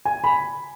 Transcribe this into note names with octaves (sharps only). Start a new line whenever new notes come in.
G#5
B5